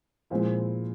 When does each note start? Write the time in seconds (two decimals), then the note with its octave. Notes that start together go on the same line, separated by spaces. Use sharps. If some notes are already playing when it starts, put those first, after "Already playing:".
0.30 A#2 F3 G#3 C4 E4